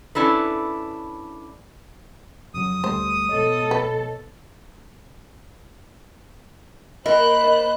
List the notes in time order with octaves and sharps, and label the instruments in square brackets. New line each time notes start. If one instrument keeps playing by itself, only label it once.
[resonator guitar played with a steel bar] C#4 D4 E4 A4 B4
[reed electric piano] F2 C#3 F#3 [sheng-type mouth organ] D#6
[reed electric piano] D2 G3 A3 [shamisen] C5
[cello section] B2 A4 [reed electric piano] C#5 D#5
[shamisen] B4
[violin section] A#3 C5 F#6 [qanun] A#4 [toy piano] D#5 G5 [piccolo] B5
[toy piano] D#5